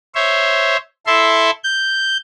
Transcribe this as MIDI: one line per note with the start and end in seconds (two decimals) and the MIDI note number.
0.15 0.77 72
0.15 0.77 73
0.15 0.77 76
1.07 1.51 64
1.07 1.51 69
1.07 1.51 76
1.07 1.51 84
1.64 2.17 91